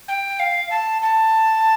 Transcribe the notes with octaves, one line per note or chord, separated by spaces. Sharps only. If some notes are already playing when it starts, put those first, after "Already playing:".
G5
F5
A5
A5